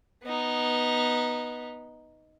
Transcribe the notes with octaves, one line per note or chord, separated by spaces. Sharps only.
B3 D#4